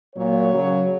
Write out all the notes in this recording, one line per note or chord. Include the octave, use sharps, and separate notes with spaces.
A#2 F#3 C#5
C#3 F#3